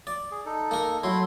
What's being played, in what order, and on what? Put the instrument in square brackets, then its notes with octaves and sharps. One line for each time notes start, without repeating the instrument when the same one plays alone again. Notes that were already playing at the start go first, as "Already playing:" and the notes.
[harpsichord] D5
[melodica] G#4
D#4 A4
[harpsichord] A#3 A#4
[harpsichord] F#3 [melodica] A3 E4 C6